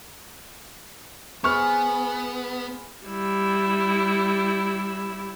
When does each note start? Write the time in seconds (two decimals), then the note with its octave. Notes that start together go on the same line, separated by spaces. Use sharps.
1.44 B3 C4 G#4 B4 C#6 F6
3.06 G3 E4